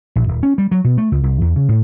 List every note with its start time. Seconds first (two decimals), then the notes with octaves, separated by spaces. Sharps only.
0.16 A#1
0.27 D#1
0.43 C#4
0.58 G3
0.71 F#3
0.84 B2
0.98 A3
1.12 C#2
1.23 C2
1.41 E2
1.56 C#3
1.69 A2